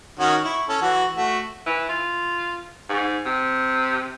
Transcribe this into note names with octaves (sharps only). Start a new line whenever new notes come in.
D#3 C#4 F#4
E4 C#6
C#4 A4
E3 F#4
A3 F#4
E3
F4
G#2
C3